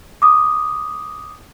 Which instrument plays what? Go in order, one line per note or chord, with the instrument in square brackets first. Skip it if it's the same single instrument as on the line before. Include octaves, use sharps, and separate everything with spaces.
[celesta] D6 D#6